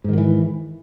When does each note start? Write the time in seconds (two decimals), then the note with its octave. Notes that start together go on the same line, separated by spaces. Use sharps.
0.04 G#2
0.09 D#3
0.13 F#3
0.18 E3